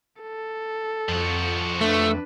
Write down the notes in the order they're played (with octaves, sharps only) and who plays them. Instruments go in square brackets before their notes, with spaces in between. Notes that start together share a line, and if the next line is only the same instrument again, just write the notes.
[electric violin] A4
[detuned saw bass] F2 [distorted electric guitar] F3 F#4
[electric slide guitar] A3 [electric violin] D4 B4